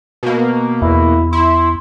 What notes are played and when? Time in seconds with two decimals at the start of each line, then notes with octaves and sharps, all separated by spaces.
0.23 B2 A#3
0.82 E2 E4
1.33 E4 C6